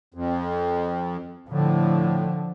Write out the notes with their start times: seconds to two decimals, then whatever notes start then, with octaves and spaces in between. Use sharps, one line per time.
0.14 F2
1.49 A2 D3 F3